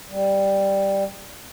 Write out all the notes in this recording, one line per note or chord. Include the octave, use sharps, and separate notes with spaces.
G3